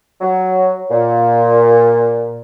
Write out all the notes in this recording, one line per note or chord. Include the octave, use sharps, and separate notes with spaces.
F#3
A#2